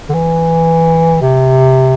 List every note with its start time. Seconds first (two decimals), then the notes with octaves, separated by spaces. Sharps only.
0.09 D3
0.14 E3
1.22 C3